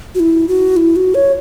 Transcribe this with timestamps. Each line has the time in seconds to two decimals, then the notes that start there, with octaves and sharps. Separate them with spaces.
0.15 F#4
0.20 E4
0.48 F#4
0.77 E4
0.96 F#4
1.15 C#5